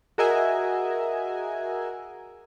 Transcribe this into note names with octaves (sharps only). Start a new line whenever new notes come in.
F#4 G#4 A#4 D#5 E5 G#5